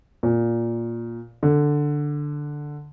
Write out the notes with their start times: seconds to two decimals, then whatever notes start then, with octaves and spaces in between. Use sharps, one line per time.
0.23 A#2
1.43 D3